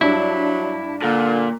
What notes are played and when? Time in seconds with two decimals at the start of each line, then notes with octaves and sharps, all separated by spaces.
0.01 G2 F#3 G3 D4 E4
1.02 A#2 D3